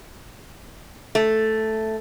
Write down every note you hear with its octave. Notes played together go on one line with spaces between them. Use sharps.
A3